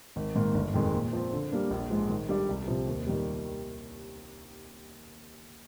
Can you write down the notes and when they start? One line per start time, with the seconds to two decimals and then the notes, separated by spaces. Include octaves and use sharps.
0.16 G#1
0.35 G#2 D#3 A#3
0.54 G1
0.74 F2 D#3 G#3
0.94 A#2
1.13 F3 C4
1.33 D3
1.52 G3 A#3 D4
1.70 A#1
1.90 G#2 F3 G#3
2.10 D#3
2.29 G3 D4 G4 D5
2.49 C2
2.68 C3 F3
2.87 D#2
3.07 D#3 G3